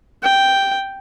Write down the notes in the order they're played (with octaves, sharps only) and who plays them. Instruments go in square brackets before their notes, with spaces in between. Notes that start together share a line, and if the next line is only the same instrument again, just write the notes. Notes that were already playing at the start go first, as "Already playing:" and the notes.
[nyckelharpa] G5